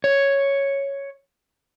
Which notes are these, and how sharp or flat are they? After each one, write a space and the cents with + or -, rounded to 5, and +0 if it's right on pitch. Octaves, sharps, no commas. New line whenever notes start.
C#5 +0